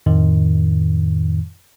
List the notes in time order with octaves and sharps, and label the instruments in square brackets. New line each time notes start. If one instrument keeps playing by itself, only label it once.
[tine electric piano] F2 A2 D#3